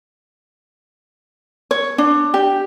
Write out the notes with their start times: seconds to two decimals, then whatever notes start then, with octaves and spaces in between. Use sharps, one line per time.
1.71 C#5
1.98 D4
2.34 G4